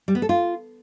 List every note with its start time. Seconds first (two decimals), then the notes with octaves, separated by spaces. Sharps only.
0.08 G3
0.15 B3
0.22 A4
0.29 F4